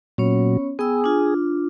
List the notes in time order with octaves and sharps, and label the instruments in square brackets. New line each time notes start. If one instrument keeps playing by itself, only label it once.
[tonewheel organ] A#2 F#3 [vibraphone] B3 C#4 C#5
[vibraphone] B3 G5 E6 [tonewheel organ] G#4
[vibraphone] D4 F4